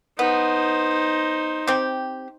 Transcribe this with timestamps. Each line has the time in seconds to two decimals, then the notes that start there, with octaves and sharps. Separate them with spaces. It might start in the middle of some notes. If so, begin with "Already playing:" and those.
0.19 B3 D#4 C5
1.67 C4 G4